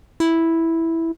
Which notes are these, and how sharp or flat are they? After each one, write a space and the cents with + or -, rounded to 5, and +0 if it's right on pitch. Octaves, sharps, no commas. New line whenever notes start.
E4 -5